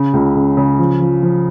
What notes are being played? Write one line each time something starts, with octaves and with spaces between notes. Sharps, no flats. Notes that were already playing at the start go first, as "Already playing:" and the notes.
Already playing: C#3
C#2
C#3
C#3
F3
F3
F3